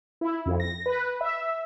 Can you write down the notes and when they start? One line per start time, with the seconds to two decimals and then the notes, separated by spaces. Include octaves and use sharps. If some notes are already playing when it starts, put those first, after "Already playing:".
0.21 E4
0.46 F2
0.60 A#6
0.86 B4
1.21 E5